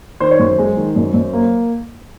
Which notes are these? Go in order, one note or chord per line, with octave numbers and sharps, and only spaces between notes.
D#3 C5
C#5
F#2 C5
G#3
D#3
F#2
F#2
A#3